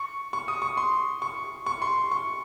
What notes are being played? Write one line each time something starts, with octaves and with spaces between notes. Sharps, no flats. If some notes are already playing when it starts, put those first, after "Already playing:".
Already playing: C#6
C#6
D#6
C#6
C6
C#6
C#6
C6
C#6